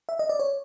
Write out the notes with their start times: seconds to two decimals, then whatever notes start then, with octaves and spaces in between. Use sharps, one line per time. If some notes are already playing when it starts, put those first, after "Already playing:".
0.09 E5
0.19 D#5
0.29 D5
0.40 C#5